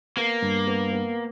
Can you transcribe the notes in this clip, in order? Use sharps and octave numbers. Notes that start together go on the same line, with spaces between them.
A#3 B3
G2
B3
B3